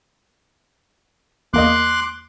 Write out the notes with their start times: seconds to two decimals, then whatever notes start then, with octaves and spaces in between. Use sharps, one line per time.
1.54 E2 A#3 D#5 C6 D6 F#6